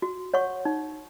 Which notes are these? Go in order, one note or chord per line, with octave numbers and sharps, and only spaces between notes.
F#4
C#5 F#5 C#6
D#4